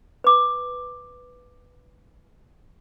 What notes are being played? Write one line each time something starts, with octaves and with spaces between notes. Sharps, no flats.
B4 D6